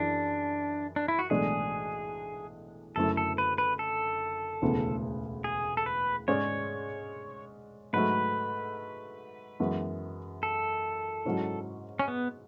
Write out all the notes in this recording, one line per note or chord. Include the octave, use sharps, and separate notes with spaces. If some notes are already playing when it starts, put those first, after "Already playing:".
Already playing: F#2 E3 D4 E4 G#4
D4
E4
F#4
B1 A2 E3 G#3 D4 G#4
F#1 F#2 D3 A3 E4 A4
A4
B4
B4
A4
E1 D2 C#3 E3 B3
G#4
A4
B4
G#2 G#3 C#4 G#4 C#5 D5
G#2 F#3 A3 B4
F#2 E3 G#3 B3 F#4
A4
G#2 F#3 C#4 E4
C#4
B3